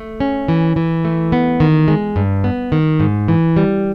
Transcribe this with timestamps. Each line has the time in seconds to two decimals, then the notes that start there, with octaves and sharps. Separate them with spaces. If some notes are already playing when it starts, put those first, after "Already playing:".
Already playing: A3
0.20 C#4
0.48 E3
0.76 E3
1.05 A3
1.32 B3
1.60 D#3
1.88 G#3
2.16 G2
2.44 B3
2.72 D#3
3.00 G#2
3.28 E3
3.57 G3